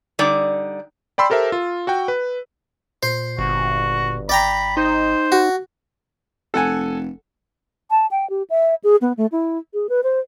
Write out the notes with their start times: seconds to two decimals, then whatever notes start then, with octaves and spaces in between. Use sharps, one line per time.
0.19 D3 G3 D#4 D5
1.18 D5 G5 B5 C6 E6
1.30 G4 A4 A#4 C5 E5
1.52 F4
1.87 F#4 F#5 G5
2.08 B4
3.03 A#2 C5
3.39 G1 F#4
4.29 G#1 D5 G5 A#5 B5
4.77 D#4 C5
5.32 F#4
6.54 F1 A4 F#5 G#5
7.90 A5
8.11 G5
8.30 G4
8.50 E5
8.84 G#4
9.01 B3
9.17 A3
9.32 E4
9.74 G#4
9.89 B4
10.03 C5